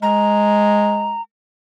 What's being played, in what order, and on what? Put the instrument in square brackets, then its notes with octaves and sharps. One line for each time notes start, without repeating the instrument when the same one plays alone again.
[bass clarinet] G#3 [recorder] A#5